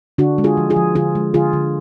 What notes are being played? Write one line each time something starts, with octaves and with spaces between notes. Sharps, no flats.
D3 D4 F#4
G#3
F4 G#4
F3
F4 G#4
F3
D3 F4 G#4
G#3
D3 F4 G#4
D3